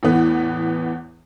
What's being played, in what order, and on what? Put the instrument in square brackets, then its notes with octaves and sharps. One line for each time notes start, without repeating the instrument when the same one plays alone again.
[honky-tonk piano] E2 A2 E3 B3